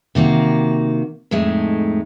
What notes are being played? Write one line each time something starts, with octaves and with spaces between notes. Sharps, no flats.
C3 D#3 A#3 F#4
F2 A2 G#3 A3 D#4